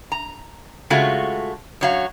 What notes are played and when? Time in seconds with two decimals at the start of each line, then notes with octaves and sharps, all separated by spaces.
0.12 A#5
0.90 C#3 G#3 A3 F4 F#4
1.81 F#2 F#3 F5